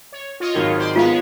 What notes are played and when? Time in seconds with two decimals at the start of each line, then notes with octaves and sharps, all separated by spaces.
0.12 C#5
0.40 F4 C#5 D#5
0.54 G#1 D#3 F#3
0.78 C5 D5 C6
0.96 G#3 B3 F4 C#5 F5